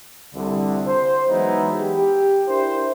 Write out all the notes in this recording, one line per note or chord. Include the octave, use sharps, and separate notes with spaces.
C2 D3
C5
E3 F#3 G#3 B3 D#4 E4
G4
D4 E4 A#4 C5